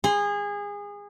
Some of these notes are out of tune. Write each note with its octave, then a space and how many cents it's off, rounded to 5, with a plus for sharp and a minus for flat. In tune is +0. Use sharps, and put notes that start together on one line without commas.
G#4 -25 C6 +0